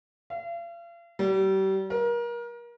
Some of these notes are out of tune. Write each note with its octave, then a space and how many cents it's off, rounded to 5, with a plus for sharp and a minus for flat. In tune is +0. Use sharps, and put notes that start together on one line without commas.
F5 -40
G3 -35
A#4 +30